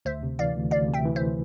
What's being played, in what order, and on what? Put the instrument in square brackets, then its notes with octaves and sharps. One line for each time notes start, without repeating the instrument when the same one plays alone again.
[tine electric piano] D2 [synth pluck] C5 E5
[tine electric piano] C3
[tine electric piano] E3 [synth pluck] D5 F5
[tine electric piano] D2
[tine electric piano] D2 [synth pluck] D5 F5
[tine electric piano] C3
[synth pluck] E5 G5
[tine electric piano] E3
[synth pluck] C5 E5